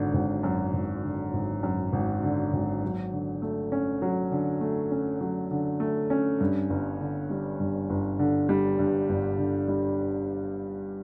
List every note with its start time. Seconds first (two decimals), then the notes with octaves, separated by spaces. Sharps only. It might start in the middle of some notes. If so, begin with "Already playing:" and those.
Already playing: G#1 F#2 D3
0.14 G#1
0.43 F#2
0.73 G#1
1.03 D3
1.33 G#1
1.63 F#2
1.93 G#1
2.23 D3
2.53 G#1
2.83 F#3
3.12 D3
3.42 A3
3.72 C#4
4.02 F#3
4.32 D3
4.61 A3
4.91 C#4
5.21 F#3
5.51 D3
5.80 A3
6.10 C#4
6.41 G2
6.70 G1
7.00 D3
7.30 G3
7.60 G2
7.90 G1
8.19 D3
8.49 G3
8.79 G2
9.09 G1
9.38 D3
9.68 G3